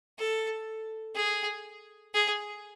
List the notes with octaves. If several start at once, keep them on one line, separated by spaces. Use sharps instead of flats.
A4
G#4
G#4